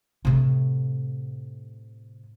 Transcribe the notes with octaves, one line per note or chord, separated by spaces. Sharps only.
A2 C3